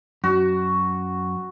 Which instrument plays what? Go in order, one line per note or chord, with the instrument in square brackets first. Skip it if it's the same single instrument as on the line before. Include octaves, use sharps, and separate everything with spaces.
[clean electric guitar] F#2 [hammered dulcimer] F#4